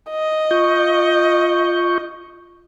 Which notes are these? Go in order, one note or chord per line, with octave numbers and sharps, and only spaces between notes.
D#5
F4 C#6 G6